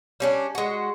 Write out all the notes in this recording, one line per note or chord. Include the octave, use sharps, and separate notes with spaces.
G3 C#4 D4
G#3 F#4